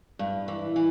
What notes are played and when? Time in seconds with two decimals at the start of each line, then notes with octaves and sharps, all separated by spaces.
0.19 G2
0.48 E3
0.76 E3